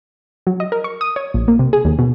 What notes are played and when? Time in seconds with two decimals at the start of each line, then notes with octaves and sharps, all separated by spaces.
0.47 F#3
0.60 D#5
0.72 A#4
0.84 C#6
1.01 D#6
1.16 C#5
1.34 A#1
1.48 A#3
1.59 C3
1.73 G#4
1.85 D#2
1.99 B2